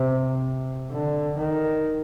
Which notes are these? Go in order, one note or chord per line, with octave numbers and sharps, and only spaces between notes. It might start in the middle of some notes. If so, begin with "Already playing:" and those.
Already playing: C3
D3
D#3